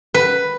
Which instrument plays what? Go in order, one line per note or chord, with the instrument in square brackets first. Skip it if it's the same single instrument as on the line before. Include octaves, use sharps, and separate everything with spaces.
[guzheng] B4